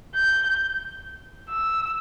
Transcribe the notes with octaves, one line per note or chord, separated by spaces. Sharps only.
G6
E6